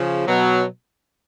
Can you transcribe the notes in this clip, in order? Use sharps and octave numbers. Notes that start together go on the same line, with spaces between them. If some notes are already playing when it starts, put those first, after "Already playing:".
Already playing: C#3 F3
B2 F#3